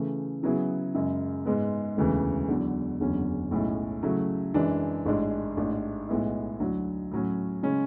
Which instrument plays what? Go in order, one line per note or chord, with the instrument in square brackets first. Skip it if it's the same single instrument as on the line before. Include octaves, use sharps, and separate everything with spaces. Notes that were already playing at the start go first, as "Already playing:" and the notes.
Already playing: [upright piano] C#3 E3 A3
C#3 F#3 B3 E4 G#4
F#2 C#3 G#3
G#2 G#3 B3
E1 D2 C#3 E3
E2 D3 F#3
F#1 E2 D3 F#3 C#4
B1 A2 G#3 C#4 E4
C#3 F#3 A3 E4
F#2 E3 G#3 D4
A1 G#2 G#3 D4
A1 G#2 G#3 D4
B1 A2 G#3 B3 E4
D2 D3 F#3
A2 F#3 C#4
C#3 G#3 C#4